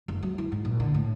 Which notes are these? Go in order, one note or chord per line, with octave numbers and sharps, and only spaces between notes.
F#1
F#3
E4
G#2
A#1
D3
A2